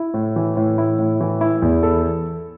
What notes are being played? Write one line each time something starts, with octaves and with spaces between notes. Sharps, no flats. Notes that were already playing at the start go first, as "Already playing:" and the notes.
Already playing: E4
A2
E3
A2
E4
A2
E3
E4
E2
A4